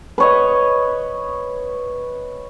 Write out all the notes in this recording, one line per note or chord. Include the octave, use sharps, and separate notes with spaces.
B4 C#5 D#5